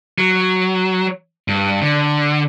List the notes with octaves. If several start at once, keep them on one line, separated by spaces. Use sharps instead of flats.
F#3
G2
D3